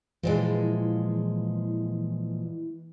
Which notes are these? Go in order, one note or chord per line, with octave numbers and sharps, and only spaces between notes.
A#2 E3 F3 G#3